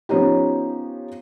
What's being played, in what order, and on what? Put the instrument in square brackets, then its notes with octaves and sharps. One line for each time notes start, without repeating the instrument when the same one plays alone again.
[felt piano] F3 B3 C#4 D#4 G4